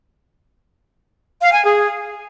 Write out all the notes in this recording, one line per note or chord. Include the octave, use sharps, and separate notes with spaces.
F5
G#5
G#4